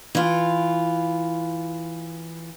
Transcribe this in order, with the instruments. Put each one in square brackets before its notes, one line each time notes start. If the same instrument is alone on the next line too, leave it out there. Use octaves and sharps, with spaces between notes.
[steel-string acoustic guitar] E3 F4